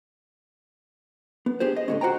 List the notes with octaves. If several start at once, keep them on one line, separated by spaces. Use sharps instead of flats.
B3
D4 G4 G#4 C5
D#5
A2 D3 C#4
F#4 C5 G5 A#5